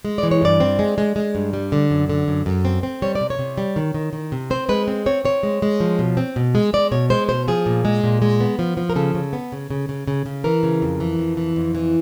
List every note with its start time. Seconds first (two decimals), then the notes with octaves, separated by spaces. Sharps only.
0.05 G#3
0.18 D5
0.23 E3
0.31 C#5
0.42 G2 D5
0.60 C4
0.79 G#3
0.98 G#3
1.16 G#3
1.35 G2
1.53 G3
1.72 D3
1.91 F#2
2.10 D3
2.28 F#2
2.46 F#2
2.65 C4
2.83 C4
3.02 G3 C#5
3.15 D5
3.21 C3
3.30 C#5
3.39 C3
3.58 G3
3.76 D#3
3.94 D#3
4.13 D#3
4.32 C3
4.50 C4 C5
4.69 G#3 B4
4.88 C4
5.06 C4 C#5
5.25 C4 C#5
5.43 G#3
5.62 G#3
5.80 F3
5.99 B2
6.17 C4
6.36 B2
6.55 G#3
6.73 G#3 D5
6.92 B2 C#5
7.10 G#3 C5
7.29 B2 C5
7.48 F3 G#4
7.66 A#2
7.85 G#3
8.04 A#2
8.22 G#3
8.40 B3
8.59 F3
8.77 F3
8.90 A#4
8.96 C#3 A4
9.15 C#3
9.33 B3
9.52 C#3
9.70 C#3
9.89 C#3
10.08 C#3
10.26 C#3
10.44 E3 A#4
10.63 C#3
10.82 F2
11.00 E3
11.19 F2
11.37 E3
11.56 F2
11.75 E3